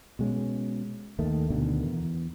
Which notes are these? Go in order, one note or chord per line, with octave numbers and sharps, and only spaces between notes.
B2 G#3 C#4
D#2 D#3 A3
D2 B2 D3 D#3
E2